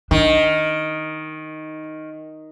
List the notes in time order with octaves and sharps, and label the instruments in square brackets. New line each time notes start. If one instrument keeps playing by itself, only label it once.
[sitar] D#3 [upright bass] D4